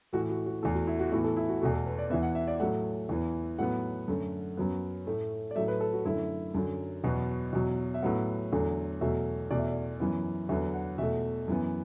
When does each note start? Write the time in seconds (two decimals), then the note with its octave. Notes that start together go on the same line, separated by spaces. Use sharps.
0.13 A2 E3 A3 F#4
0.30 F#4
0.46 F#4
0.63 E2 E3 A3 A4
0.75 F#4
0.87 E4
0.99 F#4
1.12 A2 E3 B3 F#4
1.24 A4
1.36 E4
1.49 F#4
1.61 E2 B2 A3 F#4
1.74 A4
1.86 B4
1.98 D5
2.10 E2 E3 B3 E5
2.23 F#5
2.35 E5
2.48 D5
2.60 A2 F#3 A3 F#5
3.09 E2 E3 B3
3.59 A2 F#3 B3 F#5
4.08 F#2 D3 A3
4.57 F#2 F#3 B3
5.07 A2 A3
5.51 D5
5.56 A2 F#3 A3 E5
5.68 B4
5.80 A4
5.93 F#4
6.05 F#2 D3 A3 E4
6.55 F#2 D3 F#3
7.04 E2 B2 F#3 B3 F#4
7.53 E2 B2 F#3
7.94 E5
8.02 A2 F#3 B3 F#5
8.52 E2 D3 F#3 A3
9.01 E2 B2 F#3 A3 E5
9.51 E2 B2 A3 D5
9.59 E5
9.67 D5
10.00 F#2 E3 B3
10.49 E2 D3 F#3 B3 E5
10.74 F#5
10.98 E2 B2 A3 E5
11.48 F#2 E3 B3